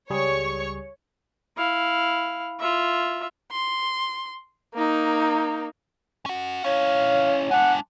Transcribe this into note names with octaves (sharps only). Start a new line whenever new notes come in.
C#2 G3 G#4 C#5 C#6
E4 F5
F4 E5
C6
A#3 D#4
C#4 F#5
C#4 E4 C#5 F5
G#3 D4 F#5